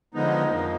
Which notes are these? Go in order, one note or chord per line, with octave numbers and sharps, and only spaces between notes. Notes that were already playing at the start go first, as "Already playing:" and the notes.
D3 F3 G#3 B3 D#4
F2 F3 A#3